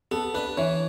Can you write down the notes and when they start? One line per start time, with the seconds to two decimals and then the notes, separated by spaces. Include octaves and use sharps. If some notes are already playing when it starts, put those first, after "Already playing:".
0.11 B3 A4
0.34 D4 B4
0.57 E3 C#5